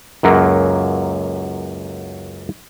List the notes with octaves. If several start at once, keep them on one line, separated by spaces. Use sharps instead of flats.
C#2 F#2 F#3 A#3